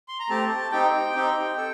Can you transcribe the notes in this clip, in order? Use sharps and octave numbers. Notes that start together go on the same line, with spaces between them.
C6
A#5
A3 C4 G4 A5
C4 D#4 G4 G5
C4 D#4 G4
A4